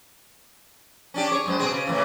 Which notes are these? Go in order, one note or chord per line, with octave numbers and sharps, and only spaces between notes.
C#4 D4 G4
G#4 C#5
F#2 G#3 C5
B2 C4 G#4
C#3
A2 C#3 E3